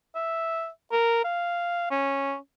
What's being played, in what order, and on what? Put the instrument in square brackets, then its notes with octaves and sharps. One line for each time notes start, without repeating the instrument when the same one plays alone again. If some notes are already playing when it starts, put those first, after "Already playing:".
[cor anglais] E5
A#4
F5
C#4